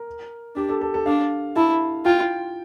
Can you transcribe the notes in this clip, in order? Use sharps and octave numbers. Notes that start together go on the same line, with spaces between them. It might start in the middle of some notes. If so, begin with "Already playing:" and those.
Already playing: A#4
D4 G4
A4
A4
A4
D4 F5
E4 A5
F4 G5